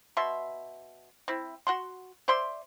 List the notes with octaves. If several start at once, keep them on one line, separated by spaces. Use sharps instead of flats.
B2 E5 C6
C4 E4
F#4 F#5 C6
C5 D5 E5 C6